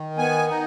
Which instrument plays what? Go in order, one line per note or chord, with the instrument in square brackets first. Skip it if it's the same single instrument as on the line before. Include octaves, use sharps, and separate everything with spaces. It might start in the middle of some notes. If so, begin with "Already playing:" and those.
Already playing: [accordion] D#3
B3 G#5
D#4